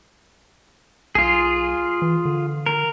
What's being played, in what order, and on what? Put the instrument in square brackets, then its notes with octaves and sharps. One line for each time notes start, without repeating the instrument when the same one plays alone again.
[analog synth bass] B1 [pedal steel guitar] F4 G#4
[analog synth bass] E3
D3
[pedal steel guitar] A#4